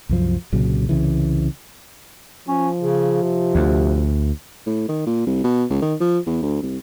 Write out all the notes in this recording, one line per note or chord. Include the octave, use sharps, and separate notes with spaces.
C2 F#2 F3
C2 A#2 C#3 F#3
C2 C#3 E3
F3 C#4
C#3
C3
D2
A2
D#3
A#2
C2
B2
C#2
D#3
F3
E2
D2
C2